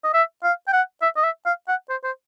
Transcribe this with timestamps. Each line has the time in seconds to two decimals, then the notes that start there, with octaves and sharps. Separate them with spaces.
0.04 D#5
0.14 E5
0.44 F5
0.68 G5
0.73 F#5
1.02 E5
1.17 D#5
1.23 E5
1.46 F5
1.68 F#5
1.90 C5
2.03 C5